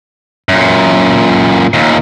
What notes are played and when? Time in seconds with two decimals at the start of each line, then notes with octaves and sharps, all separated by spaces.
0.49 F#2 A#2
1.74 D#2 A#2